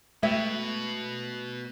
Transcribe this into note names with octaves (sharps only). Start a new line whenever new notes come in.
B2 G#3 A3 F#4 E5 G5